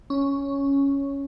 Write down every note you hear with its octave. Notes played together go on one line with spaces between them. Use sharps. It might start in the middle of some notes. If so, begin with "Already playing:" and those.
C#4